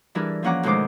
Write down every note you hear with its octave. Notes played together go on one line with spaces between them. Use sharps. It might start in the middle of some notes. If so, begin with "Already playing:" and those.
E3 G3 D4 E4 G#4 A#4
F3 A#3 C#4 F#5 A#5 D6
D2 B2 D#3 G#3 C5 D6